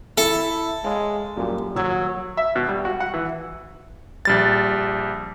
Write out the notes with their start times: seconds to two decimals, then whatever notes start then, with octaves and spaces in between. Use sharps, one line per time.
0.18 E4 A4 E5
0.84 G#3 C#5 F5 G#5
1.37 F#2 A#2 G3
1.76 D#1 F#3 E6 G#6
2.37 E5
2.56 B2
2.68 G3
2.85 F#4
3.00 F#5
3.14 E3
4.25 A#1 G3 A6